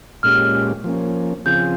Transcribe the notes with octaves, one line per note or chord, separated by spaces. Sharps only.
A#2 G#3 C#4 G4 F6
F3 A#3 C#4
C#3 F3 C4 F4 G#4 G6